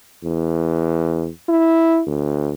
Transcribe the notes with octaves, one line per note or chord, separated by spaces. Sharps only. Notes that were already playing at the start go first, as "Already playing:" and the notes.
E2
E4
D2